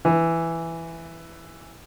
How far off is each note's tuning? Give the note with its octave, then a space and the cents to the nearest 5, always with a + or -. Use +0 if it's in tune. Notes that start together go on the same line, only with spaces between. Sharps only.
E3 +5